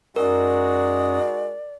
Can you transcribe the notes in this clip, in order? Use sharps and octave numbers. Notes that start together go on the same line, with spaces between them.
F#2 G#3 C#4 D#4 F#4 A#4 D5 D#6